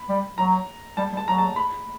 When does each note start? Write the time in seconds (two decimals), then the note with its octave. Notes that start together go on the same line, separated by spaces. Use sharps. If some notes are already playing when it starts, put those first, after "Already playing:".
Already playing: B5
0.09 G3
0.37 F#3 A#5
0.97 G3 A5
1.12 G3
1.17 A5
1.27 F#3 A#5
1.38 A5
1.56 B5